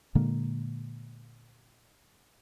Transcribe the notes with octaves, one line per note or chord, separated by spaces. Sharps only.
A#2 D3 G#3 A#3